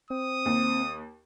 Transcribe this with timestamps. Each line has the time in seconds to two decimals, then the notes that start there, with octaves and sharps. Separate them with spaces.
0.10 C4 D#6
0.46 D#2